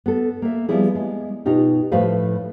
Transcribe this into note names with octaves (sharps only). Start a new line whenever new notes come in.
B3 A4
A#3 E5
F3 G3 B3 E4 G#4
G#3
B2 D#4 F4 G4
A2 F3 A3 B4 C5 F5